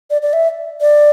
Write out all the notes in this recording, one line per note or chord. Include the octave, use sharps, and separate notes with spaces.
D5
D5
E5
D5